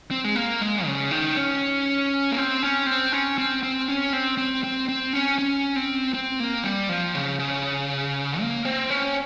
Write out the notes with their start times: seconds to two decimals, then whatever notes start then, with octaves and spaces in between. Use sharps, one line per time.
0.11 C4
0.24 G#3
0.35 A#3
0.62 G#3
0.86 C#3
1.11 D#3
1.37 C#4
2.32 A#3
2.37 C4
2.63 C#4
2.87 C4
3.12 C#4
3.38 C4
3.63 C4
3.88 C#4
4.13 C4
4.38 C4
4.64 C4
4.89 C4
5.13 C#4
5.39 C#4
5.76 C4
6.14 C4
6.40 A#3
6.64 G3
6.89 F3
7.15 C#3
7.39 C#3
8.41 A#3
8.65 C4
8.90 C#4